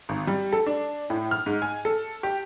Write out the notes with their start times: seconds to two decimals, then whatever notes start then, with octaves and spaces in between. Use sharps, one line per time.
0.09 G#1
0.27 G3
0.53 A4
0.66 D4
1.10 A2
1.31 F6
1.46 G#2
1.62 G#5
1.85 A4
2.23 G4